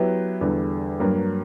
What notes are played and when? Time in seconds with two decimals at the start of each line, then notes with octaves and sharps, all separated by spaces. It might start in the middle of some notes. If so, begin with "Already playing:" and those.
Already playing: F#3 B3 E4 G4 B4
0.41 E2 D3 G3
1.00 G2 F#3 A#3